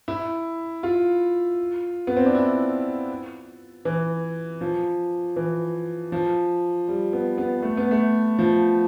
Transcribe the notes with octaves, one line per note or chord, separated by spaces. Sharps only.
E4
F4
B3
C4
D4
E4
E3
F3
E3
F3
G3
B3
B3
A3
B3
A3
F3